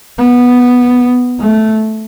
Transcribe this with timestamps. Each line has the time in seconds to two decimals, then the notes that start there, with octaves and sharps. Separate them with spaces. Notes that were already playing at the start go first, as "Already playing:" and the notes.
0.19 B3
1.40 A3